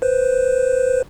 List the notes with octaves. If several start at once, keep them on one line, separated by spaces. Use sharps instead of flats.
B4 C5